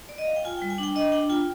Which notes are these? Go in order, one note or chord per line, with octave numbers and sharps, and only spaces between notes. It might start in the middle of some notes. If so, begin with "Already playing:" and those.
D5
D#5
F5
G5
F4 G#5
G3 G5
G#5
D4 G5
D4 D#5
D4 G5
F4 G5